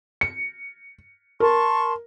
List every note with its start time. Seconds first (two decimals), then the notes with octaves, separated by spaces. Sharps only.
0.21 C#7
1.40 A#4 A5 C6 C#6